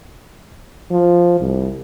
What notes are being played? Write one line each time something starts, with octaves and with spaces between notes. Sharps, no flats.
F3
C2